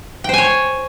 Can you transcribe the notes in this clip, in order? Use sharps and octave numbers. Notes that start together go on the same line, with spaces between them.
C5 C#5 G5 G#5